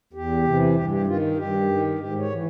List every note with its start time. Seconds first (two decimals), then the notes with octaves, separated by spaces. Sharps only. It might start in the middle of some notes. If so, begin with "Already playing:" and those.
0.13 E2 G4
0.44 C3 E3
0.75 G2 G4
0.91 G4
1.07 D#3 F4
1.37 G2 G4
1.68 D#3
1.99 G#2 G4
2.19 C#5
2.30 E3